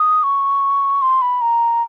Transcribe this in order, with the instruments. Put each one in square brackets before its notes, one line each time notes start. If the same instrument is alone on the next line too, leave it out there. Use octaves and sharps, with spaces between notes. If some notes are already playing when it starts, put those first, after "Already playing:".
Already playing: [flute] D#6
C#6
C6
B5
A#5